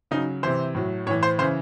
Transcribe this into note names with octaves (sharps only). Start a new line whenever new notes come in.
C#3 F#3 D#4
C3 E3 C5
A2 F#3
A2 E3 C#5
C5
C#3 E3 C5